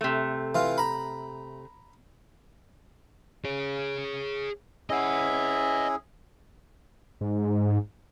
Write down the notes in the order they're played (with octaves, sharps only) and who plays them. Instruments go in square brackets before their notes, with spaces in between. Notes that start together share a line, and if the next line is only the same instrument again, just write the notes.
[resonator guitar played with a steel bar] C3 A3
[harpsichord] E3 F4
A#5 B5
[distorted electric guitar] G#4 C#5
[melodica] C#4 E4 G#4 [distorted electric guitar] D#5 F#5
[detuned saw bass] G#2